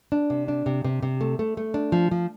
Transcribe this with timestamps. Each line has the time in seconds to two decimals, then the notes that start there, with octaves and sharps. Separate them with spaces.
0.12 D4
0.30 C3
0.48 D4
0.66 C3
0.84 C3
1.03 C3
1.21 A3
1.39 A3
1.57 A3
1.74 D4
1.92 F3
2.11 F3